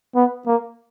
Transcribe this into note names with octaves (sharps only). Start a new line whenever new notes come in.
B3
A#3